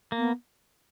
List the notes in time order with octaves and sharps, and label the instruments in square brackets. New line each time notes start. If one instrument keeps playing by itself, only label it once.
[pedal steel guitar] A#3
[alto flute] B3